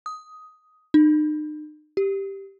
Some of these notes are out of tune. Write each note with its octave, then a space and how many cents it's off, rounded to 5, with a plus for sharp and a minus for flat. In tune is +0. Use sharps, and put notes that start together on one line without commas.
D#6 +10
D#4 -40
G4 +0